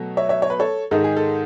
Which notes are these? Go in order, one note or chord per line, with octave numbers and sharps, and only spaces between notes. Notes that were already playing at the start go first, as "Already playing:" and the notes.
Already playing: B2 F#3 A3
C#5 E5
C#5 E5
C#5
B4
A4 C#5
G#2 D#3 G#3 D#4 A4
G#4
A4